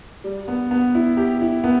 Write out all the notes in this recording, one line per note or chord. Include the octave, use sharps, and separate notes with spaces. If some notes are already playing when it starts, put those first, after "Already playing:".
G3
B3
B3
E4
G4
E4
B3